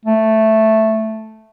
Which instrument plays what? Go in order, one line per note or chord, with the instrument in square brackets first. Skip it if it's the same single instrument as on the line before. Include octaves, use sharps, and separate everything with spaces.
[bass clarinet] A3